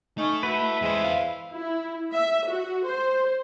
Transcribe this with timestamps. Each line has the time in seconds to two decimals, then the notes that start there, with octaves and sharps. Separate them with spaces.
0.18 A3 C#4 D#4
0.43 E4 F#4 B4
0.82 E2 G#3 C5
1.04 F5
1.52 E4
2.12 E5
2.47 F#4
2.86 C5